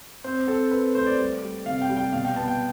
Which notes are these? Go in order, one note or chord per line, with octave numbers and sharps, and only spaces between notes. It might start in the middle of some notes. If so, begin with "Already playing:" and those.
C4 C5
C4 A4
C4 B4
A3 C5
D5
G3
G3
C3 F5
G5
G3
G5
B2 F5
G5
B3 A5
G5